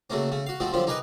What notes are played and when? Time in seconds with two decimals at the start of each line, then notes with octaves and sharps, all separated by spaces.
0.10 C#3 F#3 A3 A#3 C#4
0.32 C#3 A3
0.46 F#4 F5
0.60 F3 G3 A3 C4 F#4
0.73 F#2 D3 F3 G3 F4
0.87 D#4 G4 G#4 A#4 B4 D#5